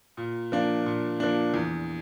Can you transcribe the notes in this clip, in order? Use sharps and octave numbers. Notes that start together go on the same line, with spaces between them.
A#2
F3 A#3 D4
A#2
F3 A#3 D4
E2